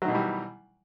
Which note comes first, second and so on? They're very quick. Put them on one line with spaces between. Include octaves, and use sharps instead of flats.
F#3 D#3 B2 E3 G3